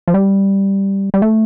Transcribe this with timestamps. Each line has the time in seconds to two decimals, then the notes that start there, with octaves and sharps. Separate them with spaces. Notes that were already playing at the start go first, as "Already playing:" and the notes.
0.08 F3
0.14 G3
1.14 G3
1.22 A3